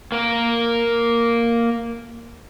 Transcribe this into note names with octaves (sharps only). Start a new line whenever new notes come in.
A#3 A#4